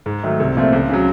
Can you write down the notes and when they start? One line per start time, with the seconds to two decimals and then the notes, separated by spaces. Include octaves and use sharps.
0.06 G#2
0.23 D#3 F#3 A3
0.40 C2
0.56 A#2 F3 A3 C4
0.73 C#2
0.89 C#3 F#3